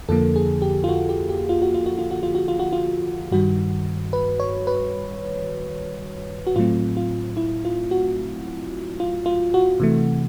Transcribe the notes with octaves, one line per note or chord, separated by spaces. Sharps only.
F2 D3 F3 A#3 A4
G#4
G4
F4
F#4
G4
G4
F4
F#4
F4
F#4
F4
F#4
F4
F#4
F4
F#4
F4
G2 D#3 G3 F#4
B4
C#5
B4
F#4
A2 F#3 A3 C4 F4
F4
E4
F4
F#4
F4
F4
F#4
C3 E3 A3